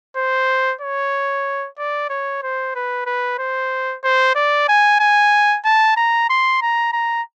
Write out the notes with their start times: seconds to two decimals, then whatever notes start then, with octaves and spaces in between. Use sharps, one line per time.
0.16 C5
0.81 C#5
1.78 D5
2.09 C#5
2.43 C5
2.75 B4
3.06 B4
3.38 C5
4.04 C5
4.35 D5
4.68 G#5
5.00 G#5
5.64 A5
5.97 A#5
6.29 C6
6.62 A#5
6.93 A#5